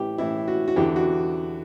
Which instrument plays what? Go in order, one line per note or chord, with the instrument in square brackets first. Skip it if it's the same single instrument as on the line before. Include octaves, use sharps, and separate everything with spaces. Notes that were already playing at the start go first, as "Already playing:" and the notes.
Already playing: [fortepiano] A2 E3 G4
A2 E3 E4
F#4
F#4
E2 D3 G4
F#4